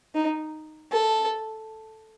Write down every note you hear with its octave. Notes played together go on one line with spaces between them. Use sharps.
D#4
A4